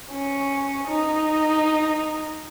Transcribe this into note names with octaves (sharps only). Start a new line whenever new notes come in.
C#4
D#4